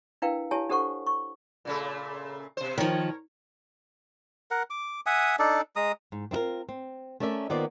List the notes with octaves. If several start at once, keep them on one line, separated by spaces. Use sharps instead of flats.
D4 E4 A#4 B4 F5 G5
E4 G4 C#5 G#5 A5
D4 G4 A4 C5 F#5 C#6
C#6
A#2 C#3 A3
B2 C5
D#3 F3 A#4 C#5
A#4 F#5
D6
E5 F#5 G#5 D#6
D4 D#4 A4 D5
G#3 A#5 D#6
G#2
C4 D4 E4 F4 A#4
C4
A3 C#4 A#4 D5 E5
D#3 A#3 B3 F4 C5 D5